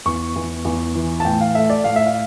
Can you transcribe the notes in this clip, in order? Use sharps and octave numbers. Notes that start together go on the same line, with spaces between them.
E2 C#6
E2
E2
E3
A5
A2 G5
F5
A3 E5
D5
A2 F5
E5
F5